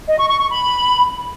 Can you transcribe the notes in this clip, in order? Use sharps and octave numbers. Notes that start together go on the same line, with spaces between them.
D#5
C#6
C#6
C#6
B5